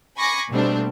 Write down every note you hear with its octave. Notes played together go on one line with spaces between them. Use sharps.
G#5 B5 C#6 D6 A#6 C7
B2 G3 A3 A#3 C4 D4